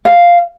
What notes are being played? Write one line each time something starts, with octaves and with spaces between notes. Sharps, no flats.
F5